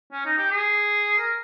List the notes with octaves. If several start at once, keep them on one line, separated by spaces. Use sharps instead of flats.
C#4
D#4
G4
G#4
A#4